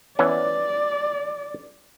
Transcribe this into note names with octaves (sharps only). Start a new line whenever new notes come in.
E3 B3 C#4 D5